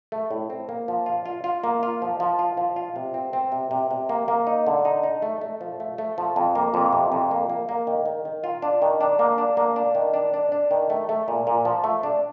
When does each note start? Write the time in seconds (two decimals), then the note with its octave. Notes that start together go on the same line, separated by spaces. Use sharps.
0.12 A3
0.31 A2
0.50 C4
0.69 A#3
0.88 F3
1.06 F4
1.26 F4
1.44 F4
1.64 A#3
1.83 F4
2.02 F3
2.20 F3
2.39 F4
2.57 F3
2.76 F4
2.96 C3
3.14 C4
3.33 C4
3.52 C3
3.71 C3
3.91 C3
4.09 A#3
4.28 A#3
4.47 D#4
4.67 D3
4.85 D#4
5.03 D#4
5.22 A3
5.41 A3
5.61 F3
5.80 A3
5.98 A3
6.18 F3
6.36 F2
6.55 A#3
6.74 F2
6.93 C3
7.12 F2
7.31 A#3
7.50 A#3
7.69 A#3
7.87 D#3
8.06 D#3
8.25 D#3
8.44 F4
8.62 D4
8.82 D#3
9.01 D4
9.19 A#3
9.38 D4
9.57 A#3
9.76 D4
9.95 D#3
10.14 D4
10.34 D4
10.52 D4
10.71 D#3
10.90 A3
11.09 A3
11.28 A#2
11.47 A#2
11.65 F3
11.84 A3
12.03 D4